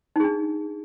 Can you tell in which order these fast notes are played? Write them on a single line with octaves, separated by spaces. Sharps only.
D#4 G#4 D4